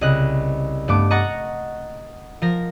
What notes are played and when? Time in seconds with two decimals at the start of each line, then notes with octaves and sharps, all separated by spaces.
0.01 C2 C#3 D#5 F#6
0.88 G2 A3 B3 D6
1.11 D#5 F#5 A#5 C#6 A6
2.42 F3 A#4 A#6